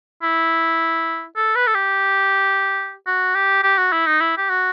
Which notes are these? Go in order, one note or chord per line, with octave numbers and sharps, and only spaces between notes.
E4
A4
B4
A4
G4
F#4
G4
G4
F#4
E4
D#4
E4
G4
F#4